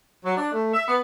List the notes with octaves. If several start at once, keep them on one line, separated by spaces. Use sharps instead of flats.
F#3
D4
A3
E5
B3